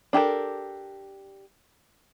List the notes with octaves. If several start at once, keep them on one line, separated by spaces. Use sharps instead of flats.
D4 G4 A4 A#4